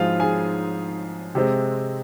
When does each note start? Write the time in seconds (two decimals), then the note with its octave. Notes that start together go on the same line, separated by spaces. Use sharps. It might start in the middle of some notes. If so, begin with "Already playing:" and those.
Already playing: G#2 F3 C4 F4 G#4 F5
0.19 G#4 G#5
1.35 C3 G#3 C4